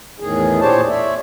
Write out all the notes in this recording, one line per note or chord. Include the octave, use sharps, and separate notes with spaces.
E2 A2 D#3 G#4
A#2 D4 G4 C5 C#5 A5
C#5 D5 E5